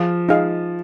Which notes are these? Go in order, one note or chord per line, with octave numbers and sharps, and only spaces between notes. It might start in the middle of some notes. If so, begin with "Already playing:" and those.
Already playing: F3 G#4 F5
D#4 G#4 F5